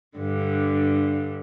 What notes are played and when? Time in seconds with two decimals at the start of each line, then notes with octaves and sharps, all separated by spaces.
0.17 G2 D3